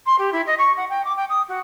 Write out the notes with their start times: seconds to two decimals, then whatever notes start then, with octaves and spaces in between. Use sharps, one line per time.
0.06 C6
0.18 G4
0.32 E4
0.46 D#5
0.58 C#6
0.77 F#5
0.89 G5
1.04 D6
1.16 G5
1.29 D#6
1.48 F#4